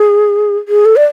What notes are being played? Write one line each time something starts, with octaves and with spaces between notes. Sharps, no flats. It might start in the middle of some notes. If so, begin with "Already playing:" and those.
Already playing: G#4
G#4
A4
D5